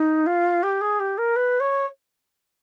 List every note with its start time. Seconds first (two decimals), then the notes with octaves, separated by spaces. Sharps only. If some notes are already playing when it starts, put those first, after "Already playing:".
Already playing: D#4
0.26 F4
0.63 G4
0.81 G#4
0.99 G4
1.18 A#4
1.36 B4
1.60 C#5